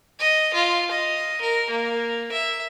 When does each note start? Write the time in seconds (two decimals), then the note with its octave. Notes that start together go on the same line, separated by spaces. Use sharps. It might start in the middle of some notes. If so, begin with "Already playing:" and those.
0.19 D#5
0.54 F4
0.91 D#5
1.41 A#4
1.70 A#3
2.32 E5